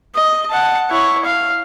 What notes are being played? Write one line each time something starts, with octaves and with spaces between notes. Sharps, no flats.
D#5
F#5 A5
E4 C#5
F5